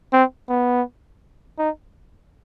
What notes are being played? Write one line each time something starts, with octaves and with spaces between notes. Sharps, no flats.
C4
B3
D#4